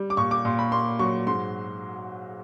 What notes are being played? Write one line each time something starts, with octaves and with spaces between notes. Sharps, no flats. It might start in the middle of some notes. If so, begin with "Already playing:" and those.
Already playing: G3
D6
A#2 C#6
D6
A#2 C6
B5
A#3 C6
F#3 C#6
G#2 C6